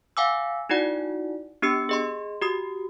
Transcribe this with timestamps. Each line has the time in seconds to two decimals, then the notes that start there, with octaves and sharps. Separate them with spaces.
0.17 F5 F#5 G#5 D6 E6
0.69 D#4 E4 F#4 D5 F#5
1.62 B3 D4 G4 E6 C#7
1.89 G#4 D#5 C6
2.41 F#4 G4 D#6